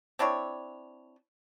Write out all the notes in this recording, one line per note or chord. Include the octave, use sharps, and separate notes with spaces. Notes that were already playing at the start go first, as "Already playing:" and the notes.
C4 D4 E4 C#5